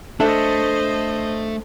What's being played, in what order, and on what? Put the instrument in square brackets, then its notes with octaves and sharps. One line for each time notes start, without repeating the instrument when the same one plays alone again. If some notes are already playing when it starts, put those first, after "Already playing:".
[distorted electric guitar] A3 [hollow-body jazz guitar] D4 E5 [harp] A4 [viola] C5 D#5